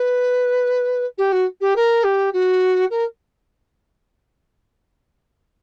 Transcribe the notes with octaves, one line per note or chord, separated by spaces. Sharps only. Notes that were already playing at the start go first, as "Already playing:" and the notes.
Already playing: B4
G4
F#4
G4
A#4
G4
F#4
A#4